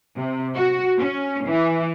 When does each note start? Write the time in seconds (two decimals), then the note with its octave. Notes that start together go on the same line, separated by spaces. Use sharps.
0.18 C3
0.56 F#4
0.99 C#4
1.47 E3